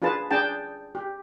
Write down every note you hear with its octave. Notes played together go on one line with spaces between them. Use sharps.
D4 F4 G#4 B4 A5
D4 G#4 G5 A5
G4